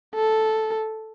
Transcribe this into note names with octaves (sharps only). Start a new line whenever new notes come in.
A4